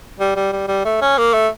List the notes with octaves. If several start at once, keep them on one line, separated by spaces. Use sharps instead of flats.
G3
G3
G3
G3
A3
C#4
A#3
A3